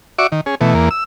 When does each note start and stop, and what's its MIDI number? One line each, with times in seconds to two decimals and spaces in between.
0.19 0.27 66
0.19 0.27 74
0.19 0.27 76
0.19 0.27 85
0.19 0.27 86
0.32 0.41 51
0.46 0.55 61
0.46 0.55 68
0.61 0.74 47
0.61 0.74 52
0.61 0.74 57
0.74 0.89 40
0.74 0.89 58
0.91 1.04 88